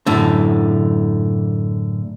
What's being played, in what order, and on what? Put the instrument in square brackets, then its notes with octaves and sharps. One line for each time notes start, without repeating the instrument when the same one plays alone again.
[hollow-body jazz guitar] F#2 A2 D3